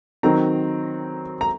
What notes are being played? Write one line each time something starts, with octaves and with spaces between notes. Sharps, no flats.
D#3 F#3 C4 D#4 A#5
A#5